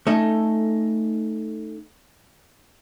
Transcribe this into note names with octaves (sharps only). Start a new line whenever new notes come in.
A3 C#4 D#4 A4